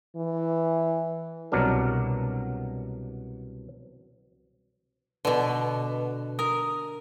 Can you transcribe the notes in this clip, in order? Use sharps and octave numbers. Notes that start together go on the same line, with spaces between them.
E3
C2 B2 F#3 D4 A#4
B2 D3 B4
A#4 D#6